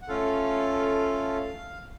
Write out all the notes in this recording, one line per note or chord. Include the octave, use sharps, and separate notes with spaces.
F#5
A3 C#4 F4 A4 F5